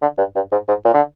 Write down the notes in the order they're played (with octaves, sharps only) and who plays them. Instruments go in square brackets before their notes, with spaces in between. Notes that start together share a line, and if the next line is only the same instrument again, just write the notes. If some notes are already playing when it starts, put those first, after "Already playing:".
[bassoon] D3
G2
G2
G#2
G#2
A#2
D3